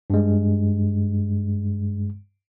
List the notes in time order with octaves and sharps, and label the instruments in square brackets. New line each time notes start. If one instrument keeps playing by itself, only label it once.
[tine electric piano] G2 G#3